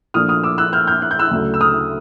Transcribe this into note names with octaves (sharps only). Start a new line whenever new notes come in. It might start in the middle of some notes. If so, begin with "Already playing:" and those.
A#2 F3 A3 D4 D#6 F6
D#6 F6
D6 E6
E6 F#6
F6 G6
F6 G6
F#6
G6
E6 F#6
D2 C#3 F#3 A3 D4
E6
D#6 F6